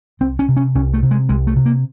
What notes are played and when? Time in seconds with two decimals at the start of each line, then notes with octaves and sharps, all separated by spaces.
0.20 C2 C4
0.39 C#4
0.48 C3
0.57 C#4
0.75 C2 C#4
0.93 A3
1.03 C3
1.11 G#3
1.29 C2 G#3
1.47 A3
1.56 C3
1.66 A#3